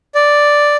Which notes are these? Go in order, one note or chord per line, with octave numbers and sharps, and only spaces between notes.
D5